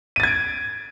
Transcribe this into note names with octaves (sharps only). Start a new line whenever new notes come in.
G#6 A6 D7 D#7